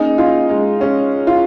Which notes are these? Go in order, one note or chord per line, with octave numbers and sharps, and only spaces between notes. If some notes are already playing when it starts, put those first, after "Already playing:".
Already playing: A#3 C#4 D#4 G#4 D#5 G#5
F4
G#3
C#4 G#4 C#5 F5
F4